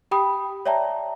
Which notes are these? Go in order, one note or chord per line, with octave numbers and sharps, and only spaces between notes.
G4 G5 B5 D#6
C#5 D5 E5 G5 A5 A#5